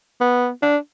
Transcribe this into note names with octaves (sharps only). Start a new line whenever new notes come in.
B3
D4